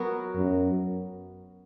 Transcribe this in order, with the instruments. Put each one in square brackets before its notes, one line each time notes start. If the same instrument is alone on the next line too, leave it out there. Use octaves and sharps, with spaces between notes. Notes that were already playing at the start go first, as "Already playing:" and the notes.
Already playing: [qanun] F#3 B3 F#4 A#4
[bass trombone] F#2